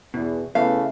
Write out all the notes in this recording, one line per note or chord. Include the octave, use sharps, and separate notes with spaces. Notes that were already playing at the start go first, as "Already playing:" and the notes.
E2 B2
C#3 E3 A3 B3 F5